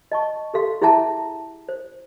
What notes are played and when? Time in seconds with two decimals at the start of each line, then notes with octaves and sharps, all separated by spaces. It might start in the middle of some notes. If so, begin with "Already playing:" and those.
0.12 D#5 A5 C#6
0.54 G4 A4 F5 C6
0.82 E4 G#4 E5 F#5 A5 A#5
1.69 C5